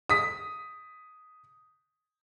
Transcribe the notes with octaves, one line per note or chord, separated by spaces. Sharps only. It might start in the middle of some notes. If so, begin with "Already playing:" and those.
D#6 B6